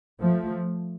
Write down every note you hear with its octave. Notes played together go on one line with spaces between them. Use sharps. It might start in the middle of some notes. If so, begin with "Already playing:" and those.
F3 A3